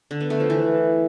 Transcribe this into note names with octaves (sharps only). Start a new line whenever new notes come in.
D3
B3
A3
F3
E3